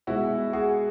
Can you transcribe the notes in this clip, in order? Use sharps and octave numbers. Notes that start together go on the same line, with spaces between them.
B2 G#3 E4 F#4
F#4 G#4